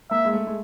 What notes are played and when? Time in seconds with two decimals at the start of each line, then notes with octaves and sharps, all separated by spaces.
0.10 A#3 E5
0.25 G#3
0.33 A3
0.47 G#3